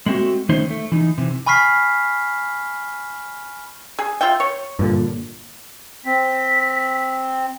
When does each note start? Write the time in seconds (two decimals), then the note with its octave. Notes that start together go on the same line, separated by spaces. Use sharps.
0.06 G#3 A3 C4 D#4 F#4
0.49 D#3 A3 C#4 D#4 C5
0.71 A3
0.92 E3 D#4
1.18 C3 E3
1.46 G#5 B5 C#6 F6 B6 C7
3.99 G#4
4.21 F4 E5 G5
4.40 C#5
4.79 G2 A#2 D3
6.06 C4 B6